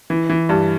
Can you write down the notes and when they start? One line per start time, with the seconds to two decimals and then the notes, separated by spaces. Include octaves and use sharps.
0.10 E3
0.30 E3
0.49 G2